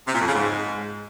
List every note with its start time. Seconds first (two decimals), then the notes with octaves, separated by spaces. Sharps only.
0.07 C3
0.14 A#2
0.21 F2
0.28 C#3
0.34 G#2